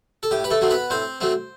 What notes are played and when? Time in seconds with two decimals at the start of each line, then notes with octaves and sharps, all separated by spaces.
0.23 A4
0.31 A2 G4
0.44 B4
0.51 A3 A4
0.61 F#3 A3 C4
0.70 B3 B4
0.90 A2 C4 C5
1.21 F#3 A3 C4